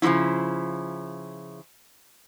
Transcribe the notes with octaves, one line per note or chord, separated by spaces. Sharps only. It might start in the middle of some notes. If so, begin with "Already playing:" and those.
C#3 F3 G3 C#4 E4